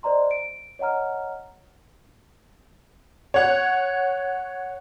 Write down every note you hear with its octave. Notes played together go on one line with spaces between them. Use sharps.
C5 D5 D#5 A#5 C6
D7
C#5 D#5 F#5 A#5 F6
C#5 F#5